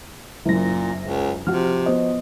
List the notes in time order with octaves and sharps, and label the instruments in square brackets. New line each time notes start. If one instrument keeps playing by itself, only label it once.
[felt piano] F#1 F#2 [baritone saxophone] A#2 [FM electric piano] E4 A#6
[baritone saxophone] C#2
[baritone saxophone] C3 [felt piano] F3 F#4 [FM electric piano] F6
[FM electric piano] B3 C5 D#5